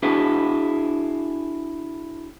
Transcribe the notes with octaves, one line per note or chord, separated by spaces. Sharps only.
D4 E4 F#4 G#4 B4